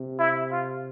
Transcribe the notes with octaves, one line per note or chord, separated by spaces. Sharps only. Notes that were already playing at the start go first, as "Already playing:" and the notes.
Already playing: C3
E4
F4